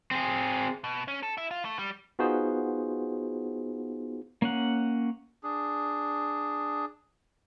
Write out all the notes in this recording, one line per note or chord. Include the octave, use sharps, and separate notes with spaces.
C4 G#4
B2
C#4
A4
E4
F4
A3
G3
B3 D#4 F4 F#4 G#4 C5
A#3 C#4 F#5
D4 G#4